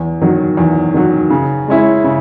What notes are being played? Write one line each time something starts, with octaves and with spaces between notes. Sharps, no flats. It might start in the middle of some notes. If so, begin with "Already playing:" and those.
Already playing: E2
D#3 F#3
E2
D#3 F#3
C#3
G#3 C#4 E4
C#3